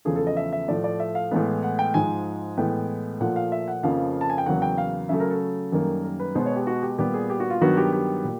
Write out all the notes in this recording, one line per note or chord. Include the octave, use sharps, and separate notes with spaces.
E2 C#3 F3 A3 G#4
A4
D#5
E5
E5
A2 F3 A3 D5
D5
E5
F5
A2 E3 G#3 B3
F#5
G5
G#2 F3 G#3 G#5
A2 E3 G#3 B3 G5
A#2 F3 A3 F#5
F5
E5
F#5
F2 C#3 F3 A#3 F5
A5
G#5
G5
E2 C#3 F#3 A#3 F#5
G5
F5
C#3 F#3 A3 E5
A#4
A4
F#2 D#3 G3 A#3
A#4
B4
B2 G#3 B3 C5
C#5
G4
F#4
G4
A#2 G3 B3 G4
G#4
G4
F#4
F4
G2 D#3 F#3 B3 F#4
G4
G4
A#2